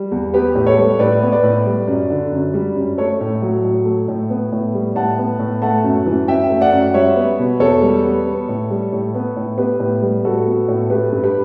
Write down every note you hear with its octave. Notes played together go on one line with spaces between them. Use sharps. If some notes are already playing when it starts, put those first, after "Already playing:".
Already playing: G3
E2
B3 G4 B4
A2
A4 C#5
G3
A2 B4 D5
B3
B4 D5
A2
G3
F#2
D3
F#2
G3
F#2
A3 A4 C#5
A2
F#3
A2
A3
A2
B3
A2
G3
A2 F#5 A5
B3
A2
A3 F#5 A5
F#2
E3
F#2 E5 G5
A3
D5 F#5
F#2
G3 C#5 E5
B3
B2
E2 A4 C#5
G3
B3
B3
A2
G3
A2
B3
A2
B3 G4 B4
A2
G3
A2 F#4 A4
B3
A2
A3 G4 B4
G2
G4 B4